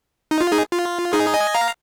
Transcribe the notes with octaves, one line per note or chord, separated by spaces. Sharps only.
D#4
F4
D#4 G#4
F4
D#4 G#4
D#5 G#5
F5 A#5